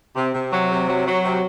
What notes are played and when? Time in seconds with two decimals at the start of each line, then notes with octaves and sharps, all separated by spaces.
0.16 C3
0.33 C3
0.51 F#3
0.71 C3
0.89 F#3
1.07 F#3
1.24 C3